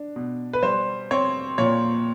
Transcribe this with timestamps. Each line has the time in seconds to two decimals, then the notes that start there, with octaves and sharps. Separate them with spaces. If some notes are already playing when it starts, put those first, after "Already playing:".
Already playing: D4
0.16 B2
0.53 B4
0.63 G3 C5
1.11 C4 C#5
1.58 A#2 C#5